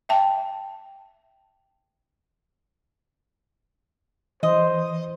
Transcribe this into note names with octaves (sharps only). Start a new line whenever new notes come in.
E5 G5 A5
E3 C5 D#5